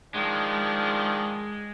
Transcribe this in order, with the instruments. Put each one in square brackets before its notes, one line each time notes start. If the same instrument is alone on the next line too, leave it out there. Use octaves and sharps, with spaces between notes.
[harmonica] D#3 F3 D4 [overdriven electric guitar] G#3